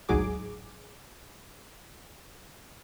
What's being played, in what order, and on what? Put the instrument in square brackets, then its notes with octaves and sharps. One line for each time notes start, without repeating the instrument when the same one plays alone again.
[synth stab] A1 D2 G#2 F#3 G#4 D6